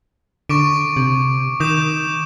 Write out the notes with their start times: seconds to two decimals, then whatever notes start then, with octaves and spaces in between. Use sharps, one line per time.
0.49 D3 C#6 D6 D7
0.96 C3
1.60 D#3 D#6 G6 E7